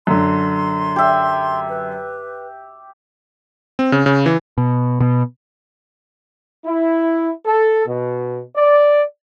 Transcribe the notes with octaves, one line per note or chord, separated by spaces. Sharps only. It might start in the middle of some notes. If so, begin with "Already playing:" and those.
F#2 D3 C6
G4 E5
B4
C4
C#3
C#3
E3
B2
B2
E4
A4
B2
D5